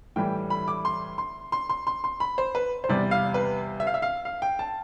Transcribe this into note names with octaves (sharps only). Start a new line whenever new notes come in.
A2 E3 G3 G5
B5
D6
C6
C6
C6
C6
C6
C6
B5
C5
B4
C5
E2 C3 G3 D5
F5
B4
E5
F5
E5
F5
F5
G5
A5